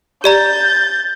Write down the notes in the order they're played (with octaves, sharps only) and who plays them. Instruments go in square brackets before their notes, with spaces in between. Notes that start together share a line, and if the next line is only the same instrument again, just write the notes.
[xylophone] G4 D5 A#5 [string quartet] G6 A6